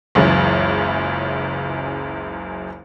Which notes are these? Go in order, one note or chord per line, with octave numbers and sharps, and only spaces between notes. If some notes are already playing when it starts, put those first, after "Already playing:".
F#1 C#2 F#2 C#3 E3